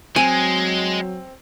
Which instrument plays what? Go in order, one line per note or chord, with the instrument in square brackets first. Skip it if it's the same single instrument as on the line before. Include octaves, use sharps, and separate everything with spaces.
[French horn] F#3 [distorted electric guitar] G#3 [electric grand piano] C4 [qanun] G#5